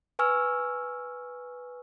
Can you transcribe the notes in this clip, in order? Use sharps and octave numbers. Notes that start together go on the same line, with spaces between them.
B4 G#5 C#6 E6 F6